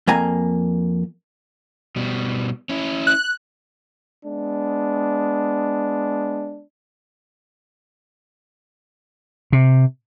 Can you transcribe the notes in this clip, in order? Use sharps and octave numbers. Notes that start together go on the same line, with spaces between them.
F2 A#3 G#5 A#5
B2 G3
C#4 E4
F#6
G#3 B3 D4
C3